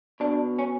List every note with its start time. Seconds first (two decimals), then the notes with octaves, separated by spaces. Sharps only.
0.20 B2 D4
0.59 C#4